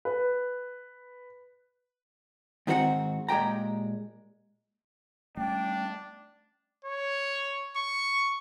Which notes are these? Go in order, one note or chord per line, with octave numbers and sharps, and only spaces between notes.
B4
G#2 D#3 C4 F#4 G#4 F#5
A#2 G#3 G4 G5 A#5
G3 A3 C#4 D4 G5
C#5
C#6